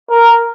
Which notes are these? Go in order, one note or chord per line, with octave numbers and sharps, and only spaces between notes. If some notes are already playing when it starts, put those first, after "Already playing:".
A#4